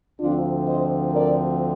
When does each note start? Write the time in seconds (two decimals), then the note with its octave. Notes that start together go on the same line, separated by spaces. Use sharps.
0.19 D2 D3 F3 C4 D4 F4
0.67 C5 D#5
1.13 A#4 D5